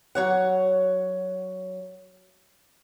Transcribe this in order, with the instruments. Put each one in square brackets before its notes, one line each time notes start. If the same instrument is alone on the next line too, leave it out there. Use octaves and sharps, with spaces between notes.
[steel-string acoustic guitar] F#3 C#5 F#5